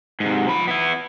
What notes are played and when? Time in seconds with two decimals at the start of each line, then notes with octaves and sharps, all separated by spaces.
0.20 G#2 C3
0.49 F3 B5
0.67 B3 E4